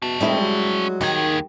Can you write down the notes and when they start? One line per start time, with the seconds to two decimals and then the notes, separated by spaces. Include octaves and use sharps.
0.02 B2 C#4 A5
0.20 F1 G3 G#3 E4
0.41 F#3
1.01 D#2 D#3 G#4